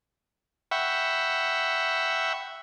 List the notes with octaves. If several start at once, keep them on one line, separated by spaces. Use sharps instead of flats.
E5 F#5 G5 B5 C#6